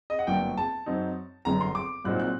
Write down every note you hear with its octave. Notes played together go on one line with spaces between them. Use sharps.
D#5
F#5
G1 F#2 F#3 A#3 D4 G5
A5
F#2 F#3 C4 D#4
G1 F#2 D3 A#5
C6
D6
C2 A#2 F#3 C4 D#4 F#6
F#6